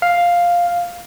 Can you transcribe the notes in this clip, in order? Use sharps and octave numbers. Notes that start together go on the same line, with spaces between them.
F5